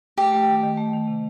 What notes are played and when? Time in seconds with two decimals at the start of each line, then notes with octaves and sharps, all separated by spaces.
0.17 A3 G4
0.32 A3
0.48 D#3
0.63 D#3
0.77 A3
0.93 D#3
1.08 C3